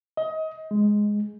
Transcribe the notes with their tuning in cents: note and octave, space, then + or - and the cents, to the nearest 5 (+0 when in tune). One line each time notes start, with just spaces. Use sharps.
D#5 +25
G#3 +0